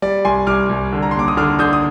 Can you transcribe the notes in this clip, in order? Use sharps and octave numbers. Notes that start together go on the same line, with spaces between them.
G3 D5
C2 G#5 C6
C2 D6 F6
C2
D3
A#5
C6
D#2 D6
D#6
D3 D6 F6
D3 D#6 G6
D#6